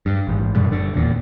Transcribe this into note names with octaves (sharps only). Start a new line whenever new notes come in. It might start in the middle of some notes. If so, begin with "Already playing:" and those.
G2
A1 G#2
F#2 B2 D3 G3
F#1 D3
D#1 E2 A#2